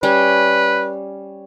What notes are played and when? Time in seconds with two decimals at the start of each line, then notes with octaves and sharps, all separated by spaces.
0.03 G3 C#4 B4 G5